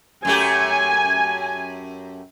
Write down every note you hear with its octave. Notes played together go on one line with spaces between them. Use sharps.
F#2 A3 G4 G#5